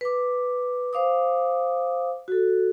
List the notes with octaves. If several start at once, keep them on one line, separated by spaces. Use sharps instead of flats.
B4 D6
C5 F5 D6 D#6
F#4 A4